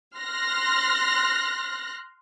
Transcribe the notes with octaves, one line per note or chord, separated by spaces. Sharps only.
C6 F6 F#6 A#6